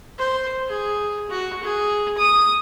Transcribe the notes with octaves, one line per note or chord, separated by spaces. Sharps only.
C5
G#4
F#4
G#4
D#6